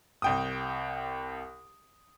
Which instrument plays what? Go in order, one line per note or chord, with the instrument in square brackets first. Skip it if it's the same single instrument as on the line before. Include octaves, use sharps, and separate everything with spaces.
[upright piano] C2 G5 D#6